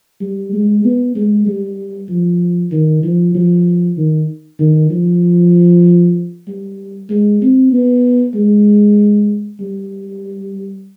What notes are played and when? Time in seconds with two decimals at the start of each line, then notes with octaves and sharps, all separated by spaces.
0.21 G3
0.53 G#3
0.84 B3
1.15 G#3
1.46 G3
2.09 F3
2.71 D#3
3.03 F3
3.35 F3
3.97 D#3
4.60 D#3
4.91 F3
6.48 G3
7.10 G#3
7.42 C4
7.72 B3
8.35 G#3
9.60 G3